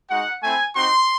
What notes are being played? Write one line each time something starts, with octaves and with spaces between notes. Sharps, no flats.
G#3 D#4 F#4 F#5
A3 C4 E4 G#5
C4 D#4 F#4 C6